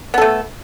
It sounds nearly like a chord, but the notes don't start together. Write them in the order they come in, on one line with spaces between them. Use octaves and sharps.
B3 A4 A3